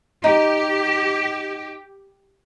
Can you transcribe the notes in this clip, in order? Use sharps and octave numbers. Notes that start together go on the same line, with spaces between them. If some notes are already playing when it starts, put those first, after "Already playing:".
D#4 G4